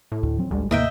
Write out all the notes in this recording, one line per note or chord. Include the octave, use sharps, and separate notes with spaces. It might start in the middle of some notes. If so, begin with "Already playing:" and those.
A2
D2
F3 F#3 C4
A1 D2 G3 G#3
D#2 A2 C3 A#3 D#5 E5 G5